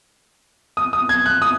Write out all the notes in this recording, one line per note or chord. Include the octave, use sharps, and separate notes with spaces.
D#6
D#6
G#6
F#6
D#6